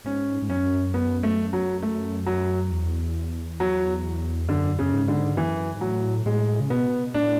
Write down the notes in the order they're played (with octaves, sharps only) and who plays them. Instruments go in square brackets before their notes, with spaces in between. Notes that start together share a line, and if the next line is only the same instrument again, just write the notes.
[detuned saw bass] G#2 [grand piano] C#4
[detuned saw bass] G#2
[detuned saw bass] F#2 [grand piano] C#4
[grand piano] B3
A3
F#3
A3
F#3
[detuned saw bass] E2
[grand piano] F#3
[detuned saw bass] F#2 [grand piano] D3
[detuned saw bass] F#2 [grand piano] C#3
[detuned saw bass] G#2
[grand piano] D3
[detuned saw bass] F#2 [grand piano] E3
[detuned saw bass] G#2
[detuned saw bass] A2 [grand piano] F#3
[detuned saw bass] A2 [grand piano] G#3
[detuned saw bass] C#3
[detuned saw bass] B2 [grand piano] B3
[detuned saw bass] A2 [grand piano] D4